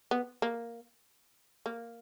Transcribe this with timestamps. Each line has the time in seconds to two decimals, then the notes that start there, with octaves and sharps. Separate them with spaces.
0.11 B3
0.42 A#3
1.66 A#3